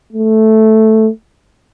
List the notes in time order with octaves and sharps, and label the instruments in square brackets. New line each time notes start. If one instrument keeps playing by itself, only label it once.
[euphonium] A3